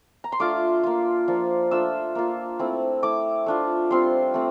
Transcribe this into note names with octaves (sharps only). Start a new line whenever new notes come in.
A#5
C6
A3 D4 F4 D6
A#3 F4
F3 A#3 D4 F4
A3 D4 F4 E6
A#3 F4
A3 C4 E4
A3 E4 D6
A3 D4 F4
G3 C4 F4 C6
A3 C4